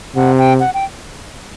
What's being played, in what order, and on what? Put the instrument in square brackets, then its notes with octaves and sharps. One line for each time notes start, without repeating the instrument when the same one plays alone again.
[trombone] C3 [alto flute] F#5
[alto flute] G5
F#5
G5